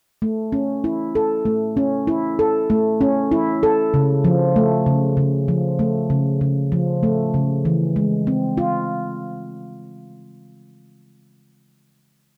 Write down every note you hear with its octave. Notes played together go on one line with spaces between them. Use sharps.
A3
C#4
E4
A4
A3
C#4
E4
A4
A3
C#4
E4
A4
C#3
F3
A3
C#3
C#3
F3
A3
C#3
C#3
F3
A3
C#3
E3
G#3
C4
F4